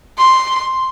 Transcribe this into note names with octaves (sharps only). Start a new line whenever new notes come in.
C6